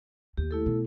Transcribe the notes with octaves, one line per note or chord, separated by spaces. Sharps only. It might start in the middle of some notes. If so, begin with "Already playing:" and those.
D#2 G4
A3 E4 A4
B2